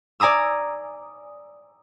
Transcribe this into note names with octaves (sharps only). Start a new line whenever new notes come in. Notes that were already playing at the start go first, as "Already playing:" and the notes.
D5 G#5 A#5 D#6 E6